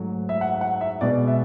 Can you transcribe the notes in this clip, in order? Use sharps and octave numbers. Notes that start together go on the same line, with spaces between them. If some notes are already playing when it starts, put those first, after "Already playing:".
Already playing: G#2 F#3 A3
E5
F#5
F#5
E5
B2 G#3 B3 D5
E5